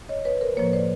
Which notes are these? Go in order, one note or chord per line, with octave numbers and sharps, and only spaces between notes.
C#5 D#5
B4 C#5
A#4 C5
A2 F3 A#3 B4 C#5
C5 D5